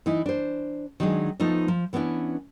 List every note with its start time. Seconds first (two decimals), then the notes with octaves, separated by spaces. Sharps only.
0.06 E3 D#4 E4
0.26 D4 C5
1.00 D#3 F#3 G#3 D4 G#4
1.40 F3 A3 B3 D#4 F4
1.68 F3
1.93 E3 B3 C#4 D4 E4